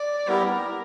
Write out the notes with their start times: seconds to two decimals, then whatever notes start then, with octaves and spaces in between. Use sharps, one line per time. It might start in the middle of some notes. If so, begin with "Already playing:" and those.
Already playing: D5
0.27 G3 B3 E4 G4 A#4